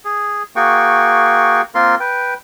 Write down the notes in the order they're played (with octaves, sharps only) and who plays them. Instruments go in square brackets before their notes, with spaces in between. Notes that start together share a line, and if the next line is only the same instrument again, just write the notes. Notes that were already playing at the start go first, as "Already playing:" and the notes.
[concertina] G#4
A#3 F#4 G#4 G5 C#6
A#3 C4 F4 A#4 C6
B4 G5